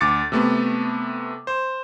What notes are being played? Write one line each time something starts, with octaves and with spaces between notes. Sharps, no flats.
D2 D6 A6 C#7
C3 A3 B3
C5